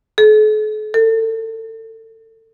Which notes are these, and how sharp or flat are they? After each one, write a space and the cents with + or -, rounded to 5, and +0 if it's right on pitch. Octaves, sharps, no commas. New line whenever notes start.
A4 -45
A4 +30